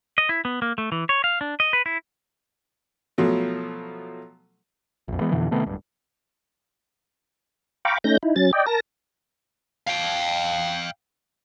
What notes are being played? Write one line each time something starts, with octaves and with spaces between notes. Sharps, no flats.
D#5
E4
B3
A#3
A3
E3
C#5
F5
D4
D#5
B4
E4
B2 F3 F#3 A3
A#1 F2
E3 G#3 B3
F2 B2 D3 E3
C3 D#3 A3 B3
D1 G2
F5 G5 A#5 B5 C#6 D6
A3 C#4 D#4 G6 A#6
D#4 E4
F#3 C#4 A6
D5 D#5 G5
A#4 A5 A#6
F5 G5